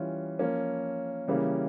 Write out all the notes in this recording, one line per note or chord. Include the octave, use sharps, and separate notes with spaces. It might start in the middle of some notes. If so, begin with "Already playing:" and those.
Already playing: E3 G3 C#4 F4
F3 A#3 C#4
C#3 E3 G3 A#3 C#4